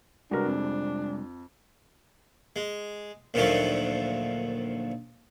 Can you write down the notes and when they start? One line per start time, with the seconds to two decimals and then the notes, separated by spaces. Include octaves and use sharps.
0.31 C3 G3 G#3 D4 F#4 A#4 B4
0.46 F2
2.56 G#3
3.34 D2 A#2 D#3 F3 F#3 A3